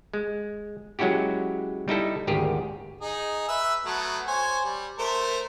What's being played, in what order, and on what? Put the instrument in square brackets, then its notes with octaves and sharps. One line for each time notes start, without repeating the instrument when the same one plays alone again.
[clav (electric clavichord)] G#3
F#3 G#3 C#4 E4 F#4 G4
G3 D#4 E4 A4
G#1 D2 G4 G#4 A#4
[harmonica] D#4 G#4
B4 E5 E6
F#3 A3 B3
C5 C#5 G#5
G3
A3 A#4 C5